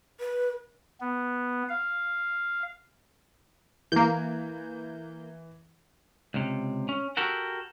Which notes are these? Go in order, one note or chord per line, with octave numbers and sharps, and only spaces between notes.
B4
B3
F5
E3 A#3 G6
C#2 C3
C#4
F#4 G4 A4 A#4 F#5